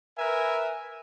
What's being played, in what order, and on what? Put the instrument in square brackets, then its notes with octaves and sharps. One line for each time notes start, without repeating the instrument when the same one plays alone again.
[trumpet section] A#4 B4 E5 G#5